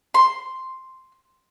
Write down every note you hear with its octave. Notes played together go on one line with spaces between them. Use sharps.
C6